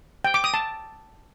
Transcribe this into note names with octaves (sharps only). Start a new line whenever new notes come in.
G5
D6
D#6
A5